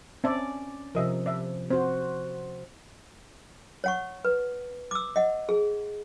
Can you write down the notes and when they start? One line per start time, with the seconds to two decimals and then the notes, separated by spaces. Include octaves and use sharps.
0.24 C4 C#4 D5 E5 A5
0.95 C3 F3 A#4 D#5 E5
1.26 D5 E5
1.70 C4 F#4 C5
3.84 C#5 F#5 C#6
4.25 B4
4.91 D6 E6
5.16 D#5 F#5
5.49 G#4